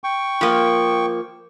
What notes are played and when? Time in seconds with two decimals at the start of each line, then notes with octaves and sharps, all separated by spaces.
0.04 G5 C#6
0.41 F3 A#3